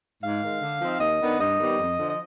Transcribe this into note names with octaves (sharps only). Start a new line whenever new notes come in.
G#2 F5
D#3 G#3
D3
F3 C4 D#4
D#2 D#5
D#3 B3 D4
G2 D#5
D#3 G3 B3
F2
D3 F3
D#5